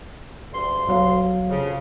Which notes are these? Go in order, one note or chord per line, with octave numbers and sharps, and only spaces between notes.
D2 G2 C6
B1 F#3 F5
F2 C#3